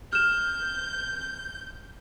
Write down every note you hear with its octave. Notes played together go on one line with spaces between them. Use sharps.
F6 G6 E7